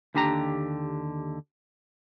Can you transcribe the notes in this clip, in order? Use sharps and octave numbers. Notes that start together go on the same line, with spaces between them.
D#2 D3 D4 G4 A5 A#5